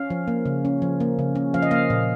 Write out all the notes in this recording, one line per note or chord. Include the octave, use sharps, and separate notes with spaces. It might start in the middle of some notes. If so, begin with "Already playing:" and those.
Already playing: C#4 F5
F3
A#3
C#3
C#4
F3
A#3
C#3
C#4
F3 F5
D#5
A#3 F5
A#2